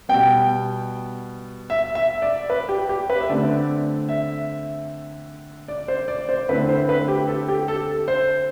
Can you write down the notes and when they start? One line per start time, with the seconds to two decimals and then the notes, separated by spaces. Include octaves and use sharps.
0.09 B2 G3 B3 G5
1.70 E5
1.95 E5
2.22 D5
2.50 B4
2.69 G4
2.89 G4
3.10 B4
3.20 E5
3.29 D3 A3 C4 D5
4.09 E5
5.68 D5
5.88 C5
6.08 D5
6.29 C5
6.49 D3 A3 C4 E4 B4
6.69 C5
6.89 B4
7.08 G4
7.28 A4
7.48 G4
7.68 A4
8.08 C5